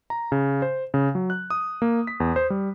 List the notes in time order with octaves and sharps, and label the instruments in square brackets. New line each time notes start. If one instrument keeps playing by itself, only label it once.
[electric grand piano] A#5
C#3
C5
C#3
F#3
F#6
D#6
A#3
B6
E2
C5
G3